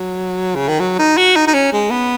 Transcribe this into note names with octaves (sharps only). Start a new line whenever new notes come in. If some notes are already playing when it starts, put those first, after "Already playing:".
Already playing: F#3
C#3
D#3
F#3
D#4
F#4
D#4
D#4
C#4
G#3
B3